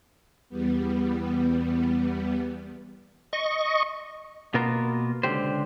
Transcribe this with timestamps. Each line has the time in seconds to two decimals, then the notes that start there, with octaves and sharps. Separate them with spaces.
0.49 E2 G3 B3
3.33 D#5 C#6
4.54 B2 A#3 B3 F4 F#4 A#4
5.23 C#2 D3 G4 C5